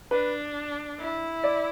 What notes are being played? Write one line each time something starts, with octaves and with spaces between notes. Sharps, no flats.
D4 B4
E4
D5